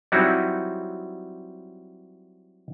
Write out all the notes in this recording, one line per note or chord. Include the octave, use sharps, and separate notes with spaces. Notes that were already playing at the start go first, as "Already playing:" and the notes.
F#3 G3 C4 D#4 E4 F#4